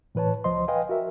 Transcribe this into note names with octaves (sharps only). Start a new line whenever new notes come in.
A2 E3 B4 C#5 A5
C#2 F3 C5 D#5 C6
B4 D#5 F5 G5 G#5
F#4 A#4 E5